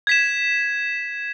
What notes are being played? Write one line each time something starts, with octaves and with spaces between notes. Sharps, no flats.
G#6 B6 E7